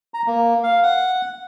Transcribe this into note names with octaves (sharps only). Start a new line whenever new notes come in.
A#5
A#3
F5
F#5